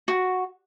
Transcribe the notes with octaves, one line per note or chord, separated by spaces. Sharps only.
F#4